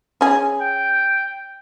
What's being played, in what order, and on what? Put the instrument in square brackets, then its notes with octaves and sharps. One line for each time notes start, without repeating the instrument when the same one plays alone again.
[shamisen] C#4 G#4
[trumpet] G5